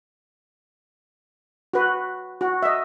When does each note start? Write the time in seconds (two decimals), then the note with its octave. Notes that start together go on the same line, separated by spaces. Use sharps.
1.74 F#4 B4
2.41 F#4
2.63 D#5 E5